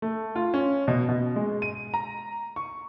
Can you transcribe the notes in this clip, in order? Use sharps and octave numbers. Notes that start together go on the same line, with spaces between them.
A3
F4
C#4
B2
B2
G#3
D#7
A#5
C#6